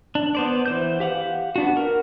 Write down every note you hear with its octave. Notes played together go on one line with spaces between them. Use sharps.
D4
B3 C5 D5
E3 C5 G6
G4 F5 F#5
B3 D4 F#4
A#4